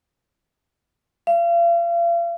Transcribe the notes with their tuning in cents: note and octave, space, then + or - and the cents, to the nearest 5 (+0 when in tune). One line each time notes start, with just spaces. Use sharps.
F5 -40